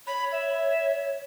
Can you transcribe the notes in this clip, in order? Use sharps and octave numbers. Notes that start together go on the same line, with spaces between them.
C#5 B5
E5